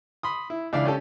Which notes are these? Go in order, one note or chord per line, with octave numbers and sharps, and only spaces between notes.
B5 C6 D#6
E4
C#2 E3 D4 D5 E5 F5
C#4 G4 A4